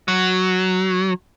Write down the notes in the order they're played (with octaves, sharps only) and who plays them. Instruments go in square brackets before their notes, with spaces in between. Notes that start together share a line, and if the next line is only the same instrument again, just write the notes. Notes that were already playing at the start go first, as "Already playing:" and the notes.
[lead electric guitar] F#3